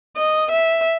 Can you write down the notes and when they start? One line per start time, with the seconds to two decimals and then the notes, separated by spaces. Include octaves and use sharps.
0.17 D#5
0.51 E5